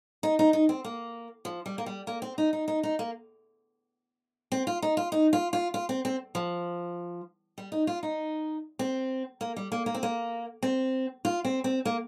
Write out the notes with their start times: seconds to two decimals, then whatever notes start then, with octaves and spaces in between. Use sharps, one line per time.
0.23 D#4
0.39 D#4
0.53 D#4
0.69 C4
0.84 A#3
1.45 F3
1.66 G3
1.78 A#3
1.86 G3
2.07 A#3
2.22 C4
2.38 D#4
2.53 D#4
2.68 D#4
2.83 D#4
2.99 A#3
4.52 C4
4.67 F4
4.82 D#4
4.97 F4
5.12 D#4
5.33 F4
5.53 F4
5.74 F4
5.89 C4
6.05 C4
6.35 F3
7.58 G3
7.72 D#4
7.87 F4
8.03 D#4
8.79 C4
9.41 A#3
9.56 G3
9.72 A#3
9.86 A#3
9.95 C4
10.03 A#3
10.63 C4
11.25 F4
11.45 C4
11.64 C4
11.85 A#3